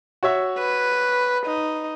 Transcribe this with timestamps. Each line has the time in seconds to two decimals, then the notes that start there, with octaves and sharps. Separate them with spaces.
0.23 F#4 C#5 E5
0.58 B4
1.46 D#4